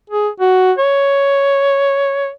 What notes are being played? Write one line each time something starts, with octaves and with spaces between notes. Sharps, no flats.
G#4
F#4
C#5